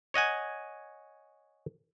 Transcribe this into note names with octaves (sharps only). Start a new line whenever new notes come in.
C#5 D#5 F#5 G#5